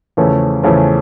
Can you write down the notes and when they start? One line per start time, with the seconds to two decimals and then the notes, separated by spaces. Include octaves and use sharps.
0.17 E2 C#3 F3 A3 C#4
0.63 E2 C#3 F3 A3 C#4